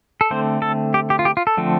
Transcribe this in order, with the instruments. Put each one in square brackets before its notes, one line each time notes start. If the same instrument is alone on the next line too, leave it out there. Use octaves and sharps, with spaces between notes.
[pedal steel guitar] A4
D3 A3 C4 C5
A4
G4
G4
F4
G4
F4
A4
D3 F3 A3 C4